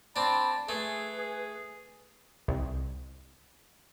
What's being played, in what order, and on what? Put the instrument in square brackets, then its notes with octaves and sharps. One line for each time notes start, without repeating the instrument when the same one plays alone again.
[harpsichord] C4 D4 [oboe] A5 [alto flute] B5
[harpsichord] A3 [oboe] G#4 [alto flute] B4
[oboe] G#4
[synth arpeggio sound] C2